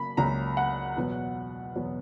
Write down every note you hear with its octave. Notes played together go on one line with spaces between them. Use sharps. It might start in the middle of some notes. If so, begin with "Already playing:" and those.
Already playing: C#3 F#3 A#3 B5
C#2 C#3 F#3 A#3 A#5
F#5
E2 B2 F#3 B3
E2 B2 F#3 B3